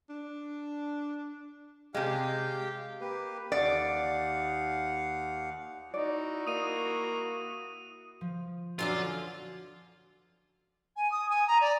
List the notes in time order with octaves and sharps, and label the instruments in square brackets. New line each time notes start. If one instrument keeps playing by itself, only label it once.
[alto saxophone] D4
[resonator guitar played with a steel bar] C3 G#3 [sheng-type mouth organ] G4 G5 [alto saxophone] F5
[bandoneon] A#3 G4 B4
[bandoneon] D#2 F5 F#5 [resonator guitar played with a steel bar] D5
[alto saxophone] D#4 [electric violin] E4 F#4 [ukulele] D5
[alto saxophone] A#3 [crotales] D#6 D#7
[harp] F3
[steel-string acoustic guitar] F#2 D3 D5 [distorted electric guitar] F4
[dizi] G#5
D#6
G#5
A#5
D5